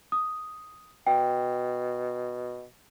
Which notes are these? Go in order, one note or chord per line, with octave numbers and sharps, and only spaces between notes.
D#6
B2 G5